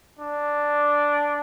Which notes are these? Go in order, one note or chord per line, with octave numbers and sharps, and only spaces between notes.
D4